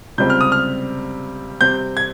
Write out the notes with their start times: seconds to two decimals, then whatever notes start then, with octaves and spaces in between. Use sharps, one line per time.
0.18 C#2 C3 G3 C4 G6
0.30 F6
0.41 D#6
0.52 F6
1.61 C3 G3 C4 G6
1.97 G#6